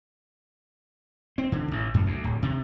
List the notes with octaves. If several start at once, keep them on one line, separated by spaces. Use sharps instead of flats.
C4
D3
A1
F#2
D2
D1
C3